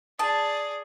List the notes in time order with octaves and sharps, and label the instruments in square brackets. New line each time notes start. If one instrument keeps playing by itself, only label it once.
[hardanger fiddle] G#4 D5 [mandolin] A5 [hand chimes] D#6